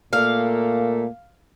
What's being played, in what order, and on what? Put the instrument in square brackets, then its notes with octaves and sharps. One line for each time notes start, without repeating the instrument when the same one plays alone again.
[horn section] A#2 A3 A#3 [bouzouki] F5